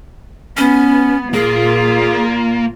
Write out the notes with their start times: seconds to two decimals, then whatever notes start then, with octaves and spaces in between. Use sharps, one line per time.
0.57 B3 C#4
1.34 A#2 A#3 F4 G#4